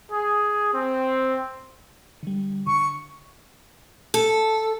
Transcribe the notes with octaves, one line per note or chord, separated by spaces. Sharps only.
G#4
C4
D3 G3
D3 C#6
A4